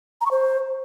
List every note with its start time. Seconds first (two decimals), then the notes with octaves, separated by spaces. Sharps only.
0.21 A#5
0.26 C#6
0.31 C5